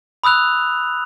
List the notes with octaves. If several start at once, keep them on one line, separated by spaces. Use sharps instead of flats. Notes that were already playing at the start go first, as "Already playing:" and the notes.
B5 D#6 E6 F#6 F7